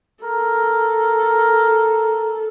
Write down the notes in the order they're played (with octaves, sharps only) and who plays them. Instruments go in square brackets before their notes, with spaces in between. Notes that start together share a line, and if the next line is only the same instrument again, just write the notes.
[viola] A4 [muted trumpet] A#4